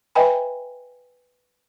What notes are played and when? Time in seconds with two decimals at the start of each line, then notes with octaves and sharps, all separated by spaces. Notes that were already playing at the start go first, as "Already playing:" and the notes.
0.15 B4 D#5 E5 G5 G#5 B5